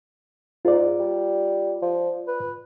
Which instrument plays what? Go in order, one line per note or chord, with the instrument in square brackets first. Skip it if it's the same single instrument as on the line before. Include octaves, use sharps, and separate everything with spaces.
[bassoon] G#2 [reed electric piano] F4 D5
[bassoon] G3
F3
B4